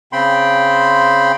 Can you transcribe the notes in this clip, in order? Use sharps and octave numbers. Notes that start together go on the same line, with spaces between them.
C#3 C4 G5 B5 C6